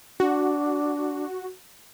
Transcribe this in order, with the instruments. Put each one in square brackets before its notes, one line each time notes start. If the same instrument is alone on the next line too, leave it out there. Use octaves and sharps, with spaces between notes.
[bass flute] D4 [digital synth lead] F#4